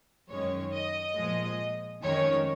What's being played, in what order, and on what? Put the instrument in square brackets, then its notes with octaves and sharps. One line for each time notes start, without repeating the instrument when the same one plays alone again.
[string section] F#2 D#3 G#3 C#4 C#5
D#5
A#2 F3 G#3
F2 D#3 G#3 C#4 C#5